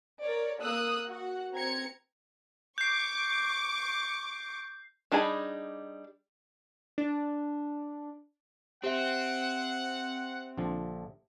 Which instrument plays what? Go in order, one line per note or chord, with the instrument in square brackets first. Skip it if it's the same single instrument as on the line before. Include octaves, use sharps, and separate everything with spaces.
[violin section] A#4 C#5 D5
A#3 D#6 E6 F#6
F#4 F#5
C4 A#5 G#6 C#7
[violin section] C#6 D6 [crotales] G6 C7
[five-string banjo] G3 D4 D#4 G#4 B5
[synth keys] D4
[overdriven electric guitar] C4 [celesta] G4 E5 [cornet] F#5
[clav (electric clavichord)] A#1 D3 F3